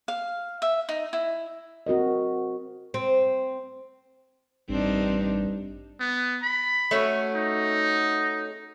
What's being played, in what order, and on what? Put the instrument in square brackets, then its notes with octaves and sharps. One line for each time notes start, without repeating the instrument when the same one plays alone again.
[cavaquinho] F5
E5
D#4
E4
[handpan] C4 F#4 A#4 D#5
[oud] C4
[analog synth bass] A1 [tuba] G2 [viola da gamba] C4 D4 D#4
[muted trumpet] B3
B5
[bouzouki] A3 C#4 F#4
[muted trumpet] D#4